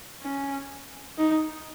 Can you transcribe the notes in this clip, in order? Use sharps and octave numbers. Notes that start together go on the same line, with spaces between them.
C#4
D#4